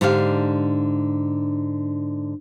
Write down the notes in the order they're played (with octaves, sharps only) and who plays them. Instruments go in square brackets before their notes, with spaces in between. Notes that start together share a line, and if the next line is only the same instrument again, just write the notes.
[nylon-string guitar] G#2 D3 D4 G4 A4 F5